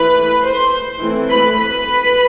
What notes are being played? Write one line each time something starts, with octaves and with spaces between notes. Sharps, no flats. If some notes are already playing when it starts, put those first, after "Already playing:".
Already playing: E3 A3 E4 B4 B5
C5 C6
E3 A3 C4 E4
B4 B5
B4 B5